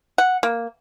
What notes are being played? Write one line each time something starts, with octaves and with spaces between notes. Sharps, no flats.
F#5
A#3